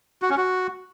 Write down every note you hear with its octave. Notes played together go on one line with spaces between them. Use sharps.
F#4
C#4
F#4